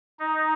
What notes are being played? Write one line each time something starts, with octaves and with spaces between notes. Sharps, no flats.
D#4